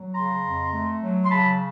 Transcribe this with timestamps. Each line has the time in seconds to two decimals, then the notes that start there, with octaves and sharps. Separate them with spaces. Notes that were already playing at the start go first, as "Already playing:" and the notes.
Already playing: F#3
0.15 C#3 A#5 C6
0.44 F2
0.74 A3
1.03 F#3
1.25 C6
1.31 C#3 A5 B5